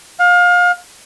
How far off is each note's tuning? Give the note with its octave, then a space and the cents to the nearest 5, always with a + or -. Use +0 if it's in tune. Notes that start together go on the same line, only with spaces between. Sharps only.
F5 +30